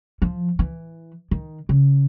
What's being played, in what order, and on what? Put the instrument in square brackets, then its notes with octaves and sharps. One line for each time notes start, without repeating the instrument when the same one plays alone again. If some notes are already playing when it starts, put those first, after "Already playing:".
[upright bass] F3
E3
D#3
C#3